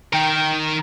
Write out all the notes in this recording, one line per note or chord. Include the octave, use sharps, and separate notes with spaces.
D#3 A#4 G5